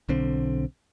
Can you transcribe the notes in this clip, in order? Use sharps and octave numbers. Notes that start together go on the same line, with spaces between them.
B1 D3 C4